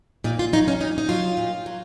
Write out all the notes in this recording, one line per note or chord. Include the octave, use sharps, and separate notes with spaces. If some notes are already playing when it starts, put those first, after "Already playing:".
A#2 D#4
F4
F#3 D#4
C#4
A#2 D#4
D#4
F#3 F4
A#2
F#3